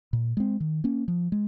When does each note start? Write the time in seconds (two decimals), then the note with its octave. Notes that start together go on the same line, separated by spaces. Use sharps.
0.13 A#2
0.37 G#3 C4
0.60 D#3
0.84 A#3 C#4
1.08 F3
1.32 G#3